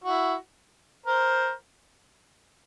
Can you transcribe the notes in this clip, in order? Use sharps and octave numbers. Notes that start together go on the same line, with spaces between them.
E4 F#4
A#4 C5